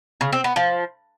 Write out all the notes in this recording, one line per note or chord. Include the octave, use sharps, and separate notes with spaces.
C#3
C4
B3
F3